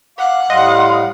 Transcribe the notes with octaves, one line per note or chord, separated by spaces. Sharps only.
F5 F#5 D6
A2 G3 D#5 F5 C6